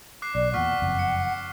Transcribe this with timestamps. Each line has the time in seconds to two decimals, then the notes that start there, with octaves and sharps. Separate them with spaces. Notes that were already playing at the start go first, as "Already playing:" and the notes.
0.22 D6 F#6 C7
0.35 B1 D5
0.54 E2 A#2 F#5 C#6 F6 B6
0.82 F#1 F2
0.99 C#7